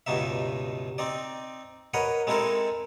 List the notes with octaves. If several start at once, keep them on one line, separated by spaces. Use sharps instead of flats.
C#2 G2 B2 D#4 E5
C4 D#4 D5
A#4 B4 C#5 D#5 F#5
G#3 C4 D#4 E4 A4 A#4